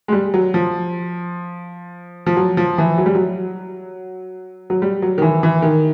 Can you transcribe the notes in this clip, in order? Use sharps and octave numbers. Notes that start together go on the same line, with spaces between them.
G#3
G3
F#3
F3
F3
F#3
F3
E3
F#3
G3
F#3
F#3
G3
F#3
D#3
E3
E3
D#3